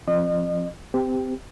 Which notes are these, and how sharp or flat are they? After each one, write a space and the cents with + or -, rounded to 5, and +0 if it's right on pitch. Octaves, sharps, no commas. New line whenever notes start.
F3 +0 C4 +20 D#5 -35
C4 -30 G4 +0